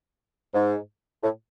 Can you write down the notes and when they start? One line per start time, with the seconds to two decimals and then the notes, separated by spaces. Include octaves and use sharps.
0.54 G#2
1.23 A2